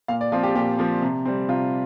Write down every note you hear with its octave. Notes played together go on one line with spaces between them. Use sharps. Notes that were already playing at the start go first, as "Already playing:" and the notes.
A#2 F5
D5
F3 C4 F4
G4
A#2 G4
F3 C4
C3
G3 C4
C3 F4